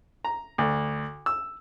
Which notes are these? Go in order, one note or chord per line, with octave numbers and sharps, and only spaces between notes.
A#5
D2
E6